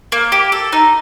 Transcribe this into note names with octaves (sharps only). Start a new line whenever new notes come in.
A#3
G4
A4
D#4